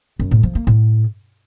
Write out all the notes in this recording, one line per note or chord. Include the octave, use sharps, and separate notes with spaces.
F#2
A2
F3
A#3
A2